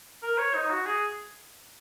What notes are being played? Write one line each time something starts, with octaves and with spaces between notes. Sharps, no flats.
A#4
C#5
D#4
F#4
G#4